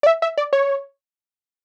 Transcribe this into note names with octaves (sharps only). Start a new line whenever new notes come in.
D5
E5
E5
D5
C#5